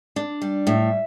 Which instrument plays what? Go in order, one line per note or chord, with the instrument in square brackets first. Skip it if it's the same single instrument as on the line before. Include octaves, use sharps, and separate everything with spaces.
[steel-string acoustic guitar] D4
G3
A2 E5